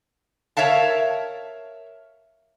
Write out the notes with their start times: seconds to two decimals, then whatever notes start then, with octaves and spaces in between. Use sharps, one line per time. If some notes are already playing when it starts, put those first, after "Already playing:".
0.57 A#4 C#5 E5 F5 A5